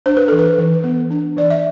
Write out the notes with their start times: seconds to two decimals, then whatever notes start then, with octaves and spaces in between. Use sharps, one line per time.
0.06 D4 C5
0.17 B4
0.28 E3 A4
0.39 B4
0.58 E3
0.84 B3
1.11 D4
1.36 E3 D5
1.50 E5